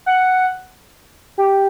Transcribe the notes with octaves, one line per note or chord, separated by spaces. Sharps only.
F#5
G4